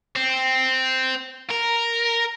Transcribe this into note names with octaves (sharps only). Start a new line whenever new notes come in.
C4
A#4